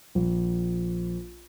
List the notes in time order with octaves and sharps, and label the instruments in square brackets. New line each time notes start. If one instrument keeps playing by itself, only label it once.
[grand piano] A#1